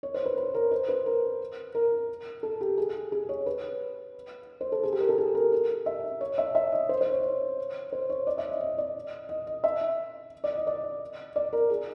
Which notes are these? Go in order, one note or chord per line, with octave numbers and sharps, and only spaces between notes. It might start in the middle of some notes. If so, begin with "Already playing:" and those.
C#5
C5
B4
B4
A#4
C5
B4
A#4
A#4
A4
G4
G#4
G#4
C#5
B4
C5
A4
G#4
G4
A#4
A4
G#4
A#4
A#4
E5
C#5
E5
E5
D#5
C5
C5
C#5
C#5
C5
C#5
D5
E5
D#5
D#5
D5
D#5
D#5
E5
D5
D#5
D5
D5
A#4
G#4